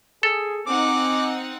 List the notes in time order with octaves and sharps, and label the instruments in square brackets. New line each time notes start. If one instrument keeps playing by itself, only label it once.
[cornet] G#4 [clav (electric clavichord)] A4
[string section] C4 D#4 F#5 [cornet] G#5 [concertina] D6